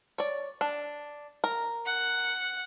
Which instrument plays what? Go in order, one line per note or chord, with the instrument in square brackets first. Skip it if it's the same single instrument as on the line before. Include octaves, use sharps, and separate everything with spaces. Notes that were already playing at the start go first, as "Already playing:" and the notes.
[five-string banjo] C#5 D5
D4
A#4
[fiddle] F#5